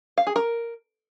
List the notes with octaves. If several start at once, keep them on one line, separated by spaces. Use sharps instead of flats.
F5
G#4
A#4